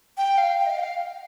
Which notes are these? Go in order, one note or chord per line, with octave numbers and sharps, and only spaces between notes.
G5
F5
G5
D#5
F5
G5
F5